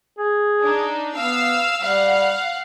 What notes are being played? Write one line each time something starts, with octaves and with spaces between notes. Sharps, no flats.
G#4
D4 D#4
B3 F5 E6
G3 F5 F#5